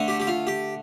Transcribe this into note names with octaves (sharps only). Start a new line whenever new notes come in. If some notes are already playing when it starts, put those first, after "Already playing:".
Already playing: D3 A3
G4
G4
F4
G4